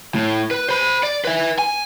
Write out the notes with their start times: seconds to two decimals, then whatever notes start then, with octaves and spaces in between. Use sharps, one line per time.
0.15 A2
0.51 B4
0.69 C5 B5
1.03 D5
1.25 B4 E5
1.59 G#5